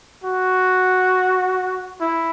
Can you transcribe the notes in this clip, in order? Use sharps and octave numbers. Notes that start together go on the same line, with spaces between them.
F#4
E4